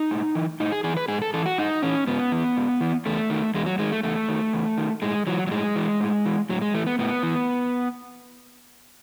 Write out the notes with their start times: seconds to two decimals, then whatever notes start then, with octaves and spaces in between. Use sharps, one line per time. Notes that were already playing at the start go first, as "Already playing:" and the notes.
Already playing: D#4
0.11 A2
0.35 E3
0.60 A2 D#4
0.72 G#4
0.84 E3 G#4
0.97 B4
1.08 G#2 G#4
1.22 A4
1.34 E3 A4
1.46 F#4
1.58 G#2 D#4
1.82 E3 C#4
2.07 G#2 B3
2.32 E3
2.57 G#2
2.81 E3
3.06 E2 A3
3.30 D#3
3.54 E2 G#3
3.66 F#3
3.79 D#3 G#3
3.92 A3
4.03 E2 A3
4.29 D#3
4.53 E2
4.78 D#3
5.02 A2 G#3
5.27 E3 F#3
5.47 F#3
5.51 A2 G#3
5.76 E3
6.00 A2
6.25 E3
6.49 A2 F#3
6.61 G#3
6.74 E3 A3
6.87 B3
6.99 A2 B3
7.23 E3